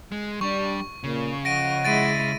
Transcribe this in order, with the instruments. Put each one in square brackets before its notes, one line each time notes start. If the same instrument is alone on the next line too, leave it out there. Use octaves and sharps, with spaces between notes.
[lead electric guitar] G#3
[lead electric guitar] G3 [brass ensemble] D4 G4 [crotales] C#6
[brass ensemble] A#2 [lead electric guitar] C#3
[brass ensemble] F3 D#5 F#5 [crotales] A#6 D7 D#7
[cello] G#3 E4 [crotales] A6 D7 D#7